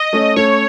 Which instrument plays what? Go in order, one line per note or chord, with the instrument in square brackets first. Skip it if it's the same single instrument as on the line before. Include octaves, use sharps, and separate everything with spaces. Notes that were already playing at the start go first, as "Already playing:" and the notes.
Already playing: [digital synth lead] D#5
[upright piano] A3 C#4
[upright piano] A3 C#4 [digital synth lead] C#5